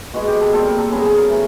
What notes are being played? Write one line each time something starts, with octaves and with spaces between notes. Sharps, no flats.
B2 G#3 B3 F#4
G4
A4
A#2 G3 C4 A4
A#4
A4
C#3 F#3 B3 G#4
G#4
A#4
E3 A3